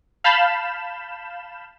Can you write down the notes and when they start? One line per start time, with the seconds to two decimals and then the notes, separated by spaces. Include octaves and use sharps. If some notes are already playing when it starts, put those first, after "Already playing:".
0.24 F5 A5 B5 G6 E7